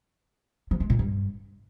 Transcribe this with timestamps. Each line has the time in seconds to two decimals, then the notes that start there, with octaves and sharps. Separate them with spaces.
0.71 F3
0.80 G#3
0.90 A#2
0.99 G2